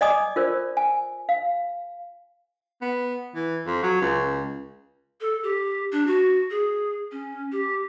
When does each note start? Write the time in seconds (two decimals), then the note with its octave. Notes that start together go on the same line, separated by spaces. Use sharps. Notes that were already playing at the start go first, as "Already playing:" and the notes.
0.01 D5 D#5 G#5 D6 D#6
0.36 F4 A#4 C5 D5
0.77 G#5
1.29 F5
2.81 B3
3.35 E3
3.66 F2
3.82 F#3
4.01 C#2
5.21 A4
5.43 G4
5.92 D4
6.07 F#4
6.51 G#4
7.12 C#4
7.52 G4